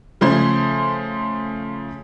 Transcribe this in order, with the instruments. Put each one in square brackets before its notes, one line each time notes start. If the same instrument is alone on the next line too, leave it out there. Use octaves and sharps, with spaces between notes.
[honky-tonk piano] C#3 F3 A3 C5 C6 G#6